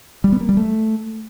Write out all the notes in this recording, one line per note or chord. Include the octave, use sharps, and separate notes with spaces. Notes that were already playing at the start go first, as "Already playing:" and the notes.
G3
B3
A#3
G3
A3